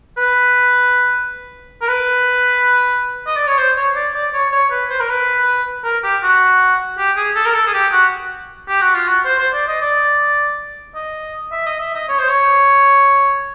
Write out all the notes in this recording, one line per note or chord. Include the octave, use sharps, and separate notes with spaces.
B4
A#4
B4
D#5
D5
C#5
C5
C#5
D5
D5
C#5
C#5
B4
C5
A#4
B4
A#4
G4
F#4
G4
G#4
A4
A#4
A4
G#4
G4
F#4
G4
F#4
F4
F#4
C5
C5
D5
D#5
D5
D#5
E5
D#5
E5
D#5
C#5
C5
C#5